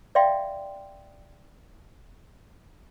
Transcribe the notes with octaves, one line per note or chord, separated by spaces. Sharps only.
D5 E5 F5 G5 C6